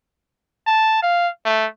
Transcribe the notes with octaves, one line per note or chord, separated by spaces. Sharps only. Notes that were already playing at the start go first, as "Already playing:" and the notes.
A5
F5
A3